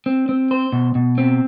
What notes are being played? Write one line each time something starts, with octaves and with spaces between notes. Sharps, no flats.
C4
C4
C5
B2
B2
C4